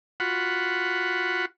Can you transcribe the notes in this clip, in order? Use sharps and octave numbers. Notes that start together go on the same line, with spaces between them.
F4 F#4 F#5 B5